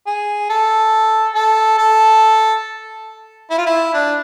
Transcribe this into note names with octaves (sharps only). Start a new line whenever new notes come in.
G#4
A4
A4
A4
E4
F4
E4
D4